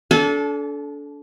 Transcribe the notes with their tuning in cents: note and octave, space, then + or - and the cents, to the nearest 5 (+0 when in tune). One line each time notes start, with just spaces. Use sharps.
D4 -30 A4 -20 G#5 +30